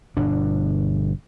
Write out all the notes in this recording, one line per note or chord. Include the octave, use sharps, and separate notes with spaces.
G1 B2 D4